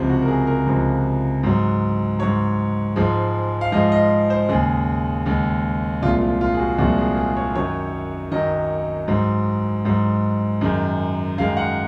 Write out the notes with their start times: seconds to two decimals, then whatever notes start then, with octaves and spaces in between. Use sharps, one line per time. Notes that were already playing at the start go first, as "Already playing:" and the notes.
Already playing: C#2 C3 F3
0.09 F#4
0.22 A#4
0.28 G#4
0.47 A#4
0.67 C#2 C3 F3
1.43 G#2 F#3
2.19 G#2 F#3 C#5
2.96 G#2 F3 G#3
3.61 F5
3.72 G#2 F3 G#3 D#5
3.92 D#5
4.30 C5
4.49 D#2 C#3 G#3 G#4
5.26 D#2 C#3 G#3
6.02 C2 A#2 F3 G#3 F4
6.21 F4
6.41 F4
6.54 G#4
6.59 F#4
6.78 C2 A#2 F3 G#3 F#4
6.98 G#4
7.17 G#4
7.37 C#5
7.55 F#2 D#3 F#3 C#5
8.31 F#2 D#3 F#3 D#5
9.08 G#2 F#3
9.85 G#2 F#3
10.61 F#2 D#3 G#3
11.38 F#2 D#3 G#3 F5
11.57 F#5